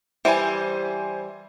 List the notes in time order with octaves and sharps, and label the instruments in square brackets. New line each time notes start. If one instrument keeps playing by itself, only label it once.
[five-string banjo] E3 G3 [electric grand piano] C5 G#5